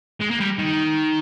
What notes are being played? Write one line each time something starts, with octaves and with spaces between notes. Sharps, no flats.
G#3
A#3
G3
D#3